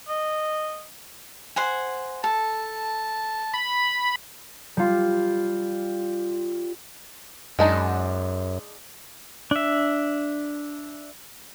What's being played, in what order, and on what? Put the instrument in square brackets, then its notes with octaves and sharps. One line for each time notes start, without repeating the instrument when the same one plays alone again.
[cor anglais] D#5
[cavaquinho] C5 F#5 G#5
[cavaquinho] A4 [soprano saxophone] A5
[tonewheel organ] B5
[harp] G3 F4
[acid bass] F#2 [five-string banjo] G#3 D4 D#4
[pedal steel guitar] D4 E5